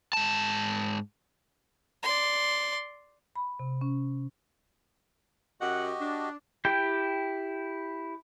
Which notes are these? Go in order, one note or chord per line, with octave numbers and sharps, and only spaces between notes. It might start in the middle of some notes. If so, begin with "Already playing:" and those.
G#2 A5
D5 C6
B5
C3
C#4
F#2 F#4 G4 D#5 F#5
D4
E4 G4 G5